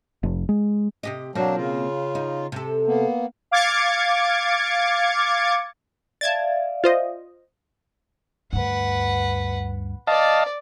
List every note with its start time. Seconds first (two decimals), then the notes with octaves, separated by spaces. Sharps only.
0.23 F1
0.49 G#3
1.03 C3 G4 D#5
1.35 B2 F#3 A#3 C4 D4
1.57 C#3 F4
2.15 D#4
2.52 C3 A4
2.87 A#3 B3
3.51 F5 D6 G#6 A6 C#7
6.21 D5 E5 F5 A5 G#6 A6
6.84 F4 C5 D#5
8.53 D2 G2 B4 F#5
10.07 D5 D#5 F5 A5